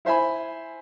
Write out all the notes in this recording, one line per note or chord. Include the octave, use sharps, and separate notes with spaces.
E4 C5 E5 G#5 B5